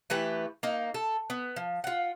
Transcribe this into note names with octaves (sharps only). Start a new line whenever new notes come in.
E3 A3 G4 B4
A#3 D#4
A4
B3
F3
F4 F#5